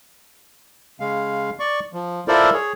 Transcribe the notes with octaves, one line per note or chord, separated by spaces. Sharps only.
C#3 G#3 F5
D5 C#6
F3
E4 F4 A4 A#4 C5 D5
G#4 C#5